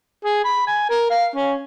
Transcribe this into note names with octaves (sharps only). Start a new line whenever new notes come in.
G#4
B5
G#5
A#4
F5
C#4